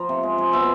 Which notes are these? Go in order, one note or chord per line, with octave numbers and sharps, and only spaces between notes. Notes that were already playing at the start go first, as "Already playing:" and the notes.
Already playing: F3 A#5
C3
G#3
G#3
B2 E5